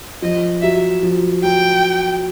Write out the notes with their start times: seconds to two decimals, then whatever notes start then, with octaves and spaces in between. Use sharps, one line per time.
0.22 F3 D#5
0.62 F#3 E5
1.03 F3
1.43 F#3 G5